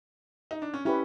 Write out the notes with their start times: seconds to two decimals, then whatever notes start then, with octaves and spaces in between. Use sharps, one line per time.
0.51 D#4
0.62 D4
0.74 C#4
0.85 C#4 E4 G4 B4